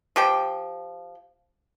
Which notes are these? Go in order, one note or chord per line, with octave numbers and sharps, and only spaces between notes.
F3 G4 G5